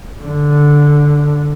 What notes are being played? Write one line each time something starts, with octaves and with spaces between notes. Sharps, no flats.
D3